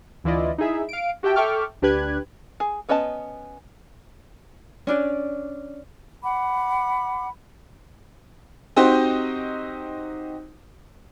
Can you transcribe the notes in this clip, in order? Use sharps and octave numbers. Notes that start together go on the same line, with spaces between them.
D2 E3 E4 F4 D5 D#5
D#4 E4 G#4 E5
F5 D7
F#4 G4 E5 G5 A5
A4 E5 G5 C#6 D6 F6
D2 D4 G4 B4 F#6 G#6
G#4
B3 C#4 B4 D#5 A5
C#4 D4 D5
F#5 B5 D6
C4 D#4 F#4 G4 C5